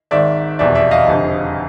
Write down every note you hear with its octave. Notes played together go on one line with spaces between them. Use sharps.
G#1 G#2 D#3 D5 E5
F1 E2 B2 D5 E5
D5 E5
D#5 F5
F1 F2 D3